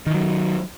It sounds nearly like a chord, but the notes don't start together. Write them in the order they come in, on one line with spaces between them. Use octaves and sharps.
D#3 E3 F#3